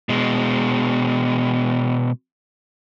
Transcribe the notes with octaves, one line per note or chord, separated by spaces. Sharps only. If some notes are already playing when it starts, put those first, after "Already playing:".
B2 G#3